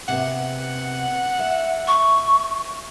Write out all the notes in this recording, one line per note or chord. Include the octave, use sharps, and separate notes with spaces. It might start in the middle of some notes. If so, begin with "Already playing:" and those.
C3 B3 F#5
E5
C#6